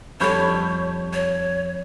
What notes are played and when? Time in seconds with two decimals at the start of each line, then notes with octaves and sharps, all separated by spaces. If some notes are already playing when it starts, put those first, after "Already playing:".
0.21 F2 G3 A4 C#5 B5 C#6 G6
1.13 C#5